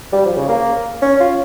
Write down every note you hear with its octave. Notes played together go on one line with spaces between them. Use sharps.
G3
F3
C#3
A#3
C#4
F4